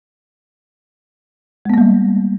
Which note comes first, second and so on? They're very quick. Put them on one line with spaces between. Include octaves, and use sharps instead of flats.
G#3 B3 A#3 G3